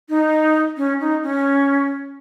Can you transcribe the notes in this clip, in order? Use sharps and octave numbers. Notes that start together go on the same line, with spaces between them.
D#4
C#4
D#4
C#4